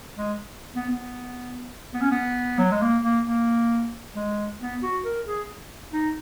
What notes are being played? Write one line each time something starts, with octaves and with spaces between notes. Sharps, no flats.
G#3
B3
B3
B3
C#4
B3
F#3
G#3
A#3
A#3
A#3
G#3
B3
F#4
A#4
G#4
D#4